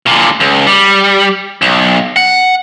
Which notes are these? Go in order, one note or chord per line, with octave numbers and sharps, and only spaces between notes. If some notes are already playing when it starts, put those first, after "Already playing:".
A#2 D3
C#2
G3
B1
F#5